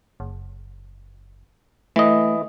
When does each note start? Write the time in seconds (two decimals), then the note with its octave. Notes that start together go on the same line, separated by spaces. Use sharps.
0.20 F#1
1.96 E3 A3 D#5